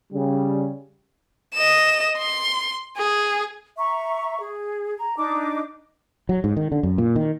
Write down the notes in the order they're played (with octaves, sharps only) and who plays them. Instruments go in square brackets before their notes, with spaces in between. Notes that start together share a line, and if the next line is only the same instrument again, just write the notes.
[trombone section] C#3 G3
[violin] D#5 E7
C6
G#4
[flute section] E5 A#5 C#6
G#4
A#5
D4 D#4 D6
[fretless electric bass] F#3
G#2
D#3
D3
F#2
A#2
D#3